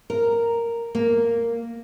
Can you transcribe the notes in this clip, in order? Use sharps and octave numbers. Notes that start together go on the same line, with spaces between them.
A#4
A#3